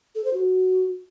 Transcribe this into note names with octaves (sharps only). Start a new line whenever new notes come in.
A4
C5
F#4